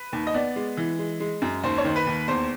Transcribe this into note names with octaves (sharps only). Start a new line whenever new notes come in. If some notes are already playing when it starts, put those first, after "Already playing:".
Already playing: B4
D#2
D#5
B3 D5
G#3
E3
G#3
G#3
F#2
D#2 C5
C#5
D#3 C5
B4
D#2
E2 C5